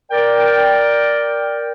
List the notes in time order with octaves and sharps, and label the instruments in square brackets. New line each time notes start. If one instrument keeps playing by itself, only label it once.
[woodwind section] A#4 D5 G5